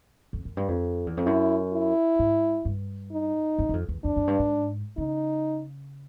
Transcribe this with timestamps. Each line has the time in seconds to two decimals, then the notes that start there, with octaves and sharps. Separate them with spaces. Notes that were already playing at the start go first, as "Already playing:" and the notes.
0.33 F2
0.45 F#2
0.57 G2
0.68 F2
1.07 E2
1.17 F2
1.26 F#2 E4
1.73 E4
2.19 G#2
2.65 G2
3.12 D#4
3.59 F#2
3.69 F#2
3.73 F2
3.89 E2
4.04 F2 D4
4.16 F#2
4.27 G2
4.39 G#2
4.97 C#3 D#4